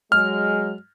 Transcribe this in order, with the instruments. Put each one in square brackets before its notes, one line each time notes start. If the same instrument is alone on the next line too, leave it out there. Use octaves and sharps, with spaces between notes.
[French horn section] F#3 G#3 [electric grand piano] F6